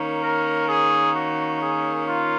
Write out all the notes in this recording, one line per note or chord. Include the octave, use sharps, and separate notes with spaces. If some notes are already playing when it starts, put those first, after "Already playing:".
Already playing: D#3 A#3 C#4
A#4
G#4
F#4
G#4
F4